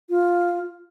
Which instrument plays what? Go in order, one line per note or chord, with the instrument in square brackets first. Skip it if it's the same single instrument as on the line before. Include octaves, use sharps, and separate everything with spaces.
[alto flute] F4